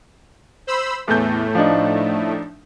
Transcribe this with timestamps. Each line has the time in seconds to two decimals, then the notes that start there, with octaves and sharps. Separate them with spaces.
0.67 C5 B5 E6
1.08 E2 A2 A3 G6
1.55 F3 D4 D#4